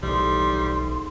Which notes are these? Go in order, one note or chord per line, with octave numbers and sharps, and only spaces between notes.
B1 E3 F3 G3 D#4 G#4 A4 C6